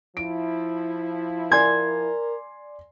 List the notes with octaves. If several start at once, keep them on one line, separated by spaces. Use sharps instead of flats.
F3 E4 D7
A#4 D5 G#5 C6 G#6